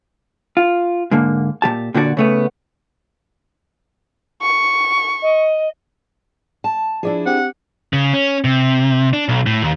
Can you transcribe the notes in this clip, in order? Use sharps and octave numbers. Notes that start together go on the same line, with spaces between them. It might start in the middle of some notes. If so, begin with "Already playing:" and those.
F4
G#2 D3 A#3
A#2 F3 G4 A5
A#2 D3 F#4 G4 D5
C#3 A3 B3
C#6
D#5
A5
F3 D4 E4 G#4 D5 E5
C4 G4 F#5
C#3
C#4
C3
D4
B1
A2
D#2